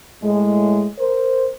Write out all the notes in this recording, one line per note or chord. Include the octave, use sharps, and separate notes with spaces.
A2 G#3
A#4 C5